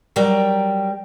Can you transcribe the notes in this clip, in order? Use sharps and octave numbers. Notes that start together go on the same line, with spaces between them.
F#3 G3 A#4 G5